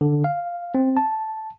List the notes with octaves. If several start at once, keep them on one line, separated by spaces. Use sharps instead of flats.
D3
F5
C4
A5